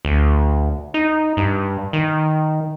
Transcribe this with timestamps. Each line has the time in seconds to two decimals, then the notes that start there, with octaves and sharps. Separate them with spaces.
0.05 D2
0.94 D#4
1.37 G2
1.93 D#3